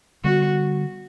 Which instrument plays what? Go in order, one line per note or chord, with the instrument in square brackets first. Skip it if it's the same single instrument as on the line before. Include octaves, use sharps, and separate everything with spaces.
[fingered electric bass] D3 G3 B3 [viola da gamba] F#4